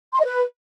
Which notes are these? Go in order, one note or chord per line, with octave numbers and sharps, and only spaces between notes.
C6
D#5
B4